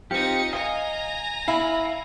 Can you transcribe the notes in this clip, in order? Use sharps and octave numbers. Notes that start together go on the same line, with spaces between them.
C4 D#4 F4 G4 C#7
D#5 F5 G#5 A#5 D#6
E4 F5